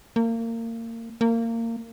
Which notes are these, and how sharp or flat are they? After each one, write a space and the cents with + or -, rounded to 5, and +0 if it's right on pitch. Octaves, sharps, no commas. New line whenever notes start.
A#3 -30
A#3 -25